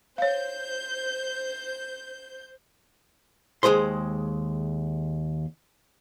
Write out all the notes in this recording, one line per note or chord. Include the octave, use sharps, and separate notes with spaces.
C5 C#5 F5 G6
D#2 G#3 G#4 C5 C6